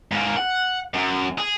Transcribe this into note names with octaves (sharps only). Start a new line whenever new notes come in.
G#2 A#3
F#5
F#2
G#4